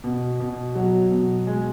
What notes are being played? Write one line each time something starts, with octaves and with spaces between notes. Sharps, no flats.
B2
B2
F#3
B2
G#3